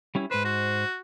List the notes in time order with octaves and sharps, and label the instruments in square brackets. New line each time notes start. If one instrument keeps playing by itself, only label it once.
[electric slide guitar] G3 C#4 E4
[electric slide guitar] G#2 C5 [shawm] B4
[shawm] F#4